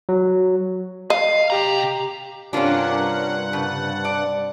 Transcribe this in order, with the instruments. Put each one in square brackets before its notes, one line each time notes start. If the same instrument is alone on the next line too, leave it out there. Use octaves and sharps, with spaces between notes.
[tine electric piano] F#3
[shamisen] D#5 [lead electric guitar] F5
[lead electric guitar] C3 A#5 [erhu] G4
[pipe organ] G2 F#5 [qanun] C3 F4 [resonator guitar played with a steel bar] C#4 D4 [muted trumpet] A#4
[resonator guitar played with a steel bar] C#3 [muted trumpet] A5
[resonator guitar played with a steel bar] D5